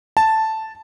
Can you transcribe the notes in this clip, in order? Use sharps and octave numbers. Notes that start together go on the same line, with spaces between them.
A5